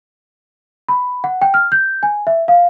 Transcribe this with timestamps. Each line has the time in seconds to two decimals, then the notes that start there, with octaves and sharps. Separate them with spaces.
0.89 B5
1.24 F#5
1.42 G5
1.54 F6
1.72 G6
2.03 G#5
2.27 E5
2.48 F5